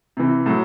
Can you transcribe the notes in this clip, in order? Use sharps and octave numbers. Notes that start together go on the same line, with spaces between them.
C3 E3
A2 F#3